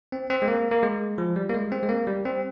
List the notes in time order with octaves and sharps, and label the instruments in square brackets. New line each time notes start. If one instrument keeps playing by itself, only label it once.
[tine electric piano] C4
C4
G#3
A#3
A#3
G#3
F3
G3
A#3
G#3
C4
G#3
A#3
G3
C4